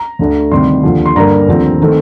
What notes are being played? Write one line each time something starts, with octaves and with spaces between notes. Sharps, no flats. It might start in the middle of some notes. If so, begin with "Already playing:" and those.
Already playing: A#5
D2 D3 A3 D4
D2 C3 D#3 G3 C6
D#2 D3 F3
C6
G2 D3 G3 A#3 A#5
D#2 D3 F3 A3 C4
D#3 A3 C4